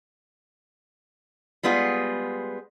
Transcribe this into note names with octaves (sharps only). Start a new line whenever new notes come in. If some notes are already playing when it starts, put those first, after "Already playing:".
G3 G#3 B3 F4 G#4